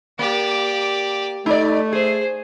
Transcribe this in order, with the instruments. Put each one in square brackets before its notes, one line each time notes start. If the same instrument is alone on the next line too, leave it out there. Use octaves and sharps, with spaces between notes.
[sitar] A#3 [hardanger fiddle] G4 D5
[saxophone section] A3 [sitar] D#4 D5
[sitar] G#4 [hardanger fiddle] C5